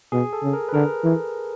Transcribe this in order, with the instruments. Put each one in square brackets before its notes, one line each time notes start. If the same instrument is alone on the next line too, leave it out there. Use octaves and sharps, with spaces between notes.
[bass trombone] B2 [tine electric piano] G#4
[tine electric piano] A4
[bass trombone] C#3
[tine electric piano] A#4
B4
[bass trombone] D3 [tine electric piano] A#4
[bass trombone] E3